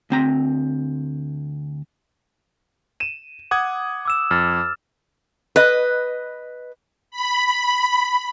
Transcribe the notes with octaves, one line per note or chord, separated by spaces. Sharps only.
D2 C4 A#5
D#7 E7
F#5 D6 D#6 G#6
D6 E6 E7
F2 F6 A6
B4 D#5
B5